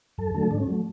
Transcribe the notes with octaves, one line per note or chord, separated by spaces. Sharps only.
F#2 A4
D3 F#3 A3 A4
G#2 D4
C#4
F#3 A3